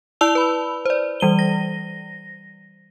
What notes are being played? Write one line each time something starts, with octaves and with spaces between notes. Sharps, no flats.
E4 D5 A5 E6 F7 G7
B4 B5
C5 D5
E3 G3 D#7 G7
A#6